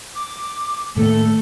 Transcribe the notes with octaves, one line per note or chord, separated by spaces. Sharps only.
D6
A2 D#3 A3 A#3 A4